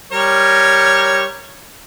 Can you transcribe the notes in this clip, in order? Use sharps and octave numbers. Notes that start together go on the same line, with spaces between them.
G3 A#4 C#5